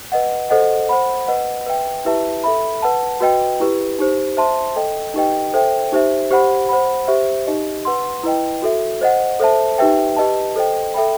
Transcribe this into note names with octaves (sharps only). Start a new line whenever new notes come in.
B4 D#5 F#5
A4 C5 D#5 F#5
C5 F#5 B5
B4 D#5 F#5
B4 E5 G5
E4 G4 B4 E5 A5
A4 E5 B5
B4 F#5 A5
F#4 B4 D#5 G5
E4 G4 B4
D#4 G4 C5
C5 E5 A5 C6
A4 D#5 G5
D#4 G4 B4 D#5 G5
A4 C5 E5 G5
D#4 G4 C5 E5
G4 C5 F#5 B5
C5 F#5 B5
G4 C5 E5
D#4 G4 D#5
B4 F#5 C6
E4 B4 D#5 G5
F#4 A4 E5
C5 D#5 F#5
A4 C5 E5 A5
D#4 G4 B4 E5 G5
G4 B4 D#5 A5
A4 C5 D#5 G5
A4 E5 G5 B5